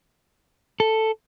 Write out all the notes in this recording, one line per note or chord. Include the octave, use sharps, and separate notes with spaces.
A4